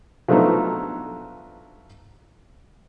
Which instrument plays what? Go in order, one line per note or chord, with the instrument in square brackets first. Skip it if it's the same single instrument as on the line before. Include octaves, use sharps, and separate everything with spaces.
[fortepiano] F3 F#3 A3 B3 D4 D#4